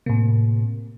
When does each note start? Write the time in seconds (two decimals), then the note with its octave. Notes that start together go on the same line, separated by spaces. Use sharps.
0.06 A2 C3 A#3